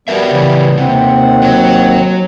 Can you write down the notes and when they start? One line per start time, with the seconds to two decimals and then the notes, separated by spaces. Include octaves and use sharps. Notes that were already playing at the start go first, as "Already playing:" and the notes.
0.08 G3 B3 F#4 A#4 E5
0.31 C#3 E3
0.78 D#2 C3 C4 F#5
1.42 F#3